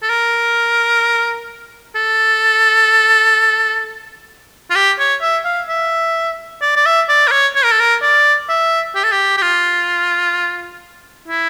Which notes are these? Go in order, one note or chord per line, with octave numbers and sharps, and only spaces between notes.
A4
A#4
A4
F4
G4
C#5
E5
F5
E5
D5
D5
E5
D5
A#4
C#5
C#5
A#4
A4
A#4
D5
E5
G4
A4
G4
G4
F4
E4